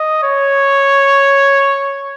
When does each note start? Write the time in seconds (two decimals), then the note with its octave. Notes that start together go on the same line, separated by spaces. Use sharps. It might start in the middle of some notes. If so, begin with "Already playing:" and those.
Already playing: D#5
0.24 C#5